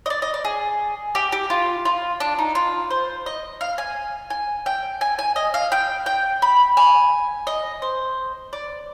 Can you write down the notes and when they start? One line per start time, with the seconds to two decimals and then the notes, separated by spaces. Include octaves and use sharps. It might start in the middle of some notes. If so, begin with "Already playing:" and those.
0.06 D#5
0.10 D5
0.22 D#5
0.34 D5
0.45 G#4
1.15 G4
1.32 G4
1.50 F4
1.85 F4
2.20 D4
2.39 D#4
2.55 F4
2.91 C5
3.26 D#5
3.61 F5
3.78 G#5
4.30 G#5
4.66 G5
5.01 G#5
5.19 G#5
5.36 D#5
5.54 F5
5.72 G5
6.06 G5
6.42 B5
6.77 G#5
7.47 D#5
7.82 C5
8.53 D5